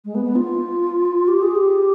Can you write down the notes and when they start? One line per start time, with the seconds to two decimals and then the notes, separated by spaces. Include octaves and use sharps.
0.05 G#3
0.15 B3
0.25 B3
0.35 F4
1.28 G4
1.42 G#4
1.55 G4